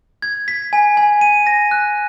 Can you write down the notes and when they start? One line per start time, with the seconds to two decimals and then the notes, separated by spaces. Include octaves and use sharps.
0.22 G#6
0.48 B6
0.73 G#5
0.97 G#5
1.21 D#7
1.47 A#6
1.71 F#6